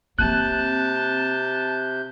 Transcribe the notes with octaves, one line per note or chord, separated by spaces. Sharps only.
C3 A#3 C4 A5 F#6 G6